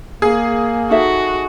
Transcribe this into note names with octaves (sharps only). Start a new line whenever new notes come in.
A#3 G#4
D#4 F#4 A4 E5